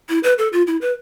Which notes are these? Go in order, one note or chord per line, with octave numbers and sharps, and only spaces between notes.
E4
B4
A4
F4
E4
B4